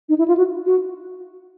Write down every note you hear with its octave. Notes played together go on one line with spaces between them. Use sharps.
D#4
E4
F4
F#4
F#4